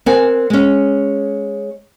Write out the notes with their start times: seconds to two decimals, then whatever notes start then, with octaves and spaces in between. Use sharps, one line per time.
0.06 C4 A#4 F#5 G#5
0.50 G#3 C#4